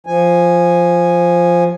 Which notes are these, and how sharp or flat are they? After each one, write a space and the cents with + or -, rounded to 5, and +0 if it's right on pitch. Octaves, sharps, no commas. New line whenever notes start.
F3 +0 G#5 +0